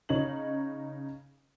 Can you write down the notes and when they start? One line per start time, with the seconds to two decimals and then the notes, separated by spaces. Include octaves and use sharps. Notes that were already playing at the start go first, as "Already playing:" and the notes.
0.09 C#3 D#4 C#5 F#7